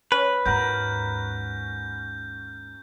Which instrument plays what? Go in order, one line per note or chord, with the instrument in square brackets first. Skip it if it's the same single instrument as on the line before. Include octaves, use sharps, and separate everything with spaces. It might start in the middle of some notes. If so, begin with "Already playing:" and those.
[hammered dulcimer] C#4 [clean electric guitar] B4
[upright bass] D#2 G#2 [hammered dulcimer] F#4 A#4 F#5 [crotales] G6